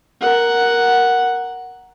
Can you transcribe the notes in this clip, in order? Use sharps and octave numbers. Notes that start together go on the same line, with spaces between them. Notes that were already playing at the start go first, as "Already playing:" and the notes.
A#4 F#5